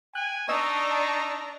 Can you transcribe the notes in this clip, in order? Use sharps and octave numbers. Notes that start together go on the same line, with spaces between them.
G5 G#5 F#6
D4 D#4 D#5 A#5 C#6 E6